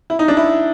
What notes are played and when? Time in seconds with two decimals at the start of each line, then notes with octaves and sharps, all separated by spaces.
0.10 E4
0.19 D#4
0.28 D4
0.37 E4